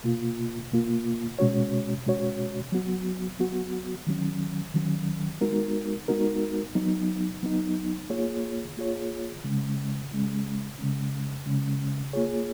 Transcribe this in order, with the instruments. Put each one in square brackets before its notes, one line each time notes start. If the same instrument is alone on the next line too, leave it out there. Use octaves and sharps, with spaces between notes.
[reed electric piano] B2 A#3 F4
B2 A#3 F4
B2 G#3 C#4 F#4 C#5
B2 G#3 C#4 F#4 C#5
F#3 B3 F#4
F#3 B3 F#4
D#3 F#3 C#4
D#3 F#3 C#4
G#3 B3 D#4 F#4 A#4
G#3 B3 D#4 F#4 A#4
F#3 B3 D#4
F#3 B3 D#4
A#3 F4 G#4 C#5
A#3 F4 G#4 C#5
C#3 G#3 C#4
C#3 G#3 C#4
C#3 G#3 C#4
C#3 G#3 C#4
A#3 F4 G#4 C#5